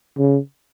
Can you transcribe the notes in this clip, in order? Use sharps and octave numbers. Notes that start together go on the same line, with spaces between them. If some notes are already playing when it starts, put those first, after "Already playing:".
C#3